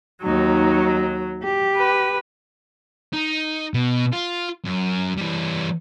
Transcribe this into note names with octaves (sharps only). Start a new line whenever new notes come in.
D#2 F#3 D#4
G4
B4
D#4
B2
F4
F#2
E3 G3